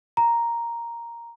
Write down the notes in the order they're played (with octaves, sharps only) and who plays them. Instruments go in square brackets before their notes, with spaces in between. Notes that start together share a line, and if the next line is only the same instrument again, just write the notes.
[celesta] A#5